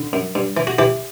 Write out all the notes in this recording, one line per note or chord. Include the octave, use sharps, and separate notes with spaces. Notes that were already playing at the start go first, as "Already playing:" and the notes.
Already playing: D3
F#2
G2
E3
F#4
E3 E4 G4